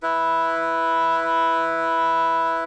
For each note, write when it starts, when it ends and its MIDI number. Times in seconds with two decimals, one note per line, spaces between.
0.03 2.64 64
0.03 2.64 71